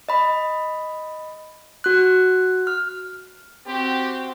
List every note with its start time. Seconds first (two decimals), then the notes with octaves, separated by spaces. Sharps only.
0.09 D#5 B5
1.84 F#4 F#6
2.67 F6
3.66 C4 F#4 G4